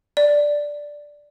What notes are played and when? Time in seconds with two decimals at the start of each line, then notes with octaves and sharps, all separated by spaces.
0.17 D5